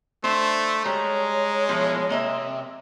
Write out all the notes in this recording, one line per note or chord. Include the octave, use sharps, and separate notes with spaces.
A3 D4 C5
G3 G#3 C#5 A#5
B2 F3 G3 E4
C3 A#3 D#5 E5